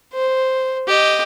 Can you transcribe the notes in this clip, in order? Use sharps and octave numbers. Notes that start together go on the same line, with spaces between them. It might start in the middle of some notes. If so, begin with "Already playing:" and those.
C5
G4 D#5